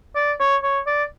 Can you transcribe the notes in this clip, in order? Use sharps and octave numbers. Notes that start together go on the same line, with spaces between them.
D5
C#5
C#5
D5